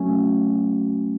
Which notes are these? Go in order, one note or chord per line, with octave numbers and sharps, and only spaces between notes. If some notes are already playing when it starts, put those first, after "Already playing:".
Already playing: F#3 A3 C#4